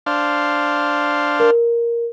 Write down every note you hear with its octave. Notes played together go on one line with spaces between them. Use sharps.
D4 C5 F5
A#4